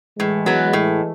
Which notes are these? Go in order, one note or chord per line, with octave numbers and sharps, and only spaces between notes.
A2 E3 G#3
F#3 B3
A2